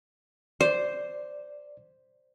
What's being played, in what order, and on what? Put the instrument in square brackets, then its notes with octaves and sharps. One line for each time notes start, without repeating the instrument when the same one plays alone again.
[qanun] C5 [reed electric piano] D5